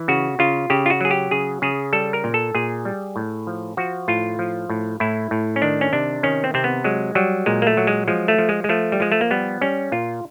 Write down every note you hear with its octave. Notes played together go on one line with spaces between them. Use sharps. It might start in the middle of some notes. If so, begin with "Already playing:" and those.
Already playing: E3
C#3 F#4
C#3 F4
C#3 G4
F4
F#4
F#3 G#4
G4
C#3 G#4
C#3 G#4
G3 A4
A#4
A#2
A4
A#2 G#4
G3
A2
F3
F3 F#4
A2 F4
F3
A2
A2 E4
A2
C#4
D#3 D4
C#4
C3 D4
D#3 C#4
C4
C3 C4
B3
F#3 G#3
F#3 G3
A#2 G#3
A#3
A3
F#3
G#3
F3 G#3
A3
F3
G#3
G#3
F3 A3
G3
F3 G#3
A3
A#3
G3 B3
G3 C#4
A#2 F4